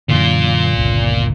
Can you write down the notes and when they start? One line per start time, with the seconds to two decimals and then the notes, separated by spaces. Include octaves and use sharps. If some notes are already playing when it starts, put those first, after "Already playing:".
0.09 F#2 A#2 D3 E3 F4
0.75 G1 C#2